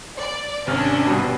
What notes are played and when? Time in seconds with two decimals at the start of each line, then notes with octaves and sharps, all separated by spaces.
0.17 D5
0.67 G#1 C3 C#4 D4 F6
1.06 G2 B2